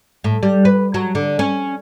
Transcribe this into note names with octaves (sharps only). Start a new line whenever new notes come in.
A2
G3
B4
F#3
D3
C#4